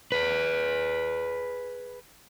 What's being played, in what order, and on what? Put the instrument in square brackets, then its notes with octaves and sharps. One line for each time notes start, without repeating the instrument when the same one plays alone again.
[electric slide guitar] G#4 B4